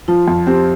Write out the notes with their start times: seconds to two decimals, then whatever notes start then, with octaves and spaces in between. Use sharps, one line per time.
0.08 F3 F4
0.28 F2
0.47 C4 G4